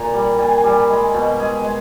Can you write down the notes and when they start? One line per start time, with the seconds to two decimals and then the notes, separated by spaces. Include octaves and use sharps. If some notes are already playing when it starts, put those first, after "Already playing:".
Already playing: A#2 A#5
0.14 G3
0.39 A#2 G#5
0.64 G3
0.89 G#3
1.14 B2
1.39 G#3 G#4
1.64 G#3